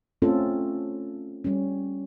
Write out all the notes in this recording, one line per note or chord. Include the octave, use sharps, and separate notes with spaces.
A3 C4 C#4 F4 A4
G3 C#4